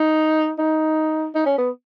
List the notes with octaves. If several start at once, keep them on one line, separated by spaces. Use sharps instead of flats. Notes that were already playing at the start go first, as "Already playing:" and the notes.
Already playing: D#4
D#4
D#4
C#4
B3